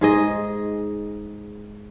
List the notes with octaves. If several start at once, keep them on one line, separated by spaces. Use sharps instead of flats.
G#2 G#4 D#5